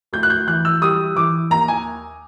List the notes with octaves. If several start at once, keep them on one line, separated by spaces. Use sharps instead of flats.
D2 G6
F#6
G6
E3 F#6
E6
G3 D#6
E3 D6
D#2 A#5
G#5